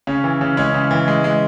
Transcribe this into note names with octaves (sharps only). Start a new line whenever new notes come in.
C#3 C#4
E3
C#3
G#3 C#4
C#3
E3
G#3
G#3